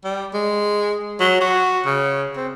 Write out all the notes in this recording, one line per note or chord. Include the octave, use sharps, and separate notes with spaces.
G3
G#3
F#3
F#4
C#3
C4